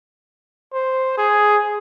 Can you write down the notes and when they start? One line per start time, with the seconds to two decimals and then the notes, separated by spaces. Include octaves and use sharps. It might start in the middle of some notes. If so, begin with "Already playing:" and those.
0.73 C5
1.17 G#4